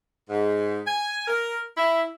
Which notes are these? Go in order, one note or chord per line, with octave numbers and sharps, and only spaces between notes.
G#2
G#5
A#4
E4